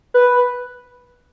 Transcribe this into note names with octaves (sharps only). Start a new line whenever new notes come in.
B4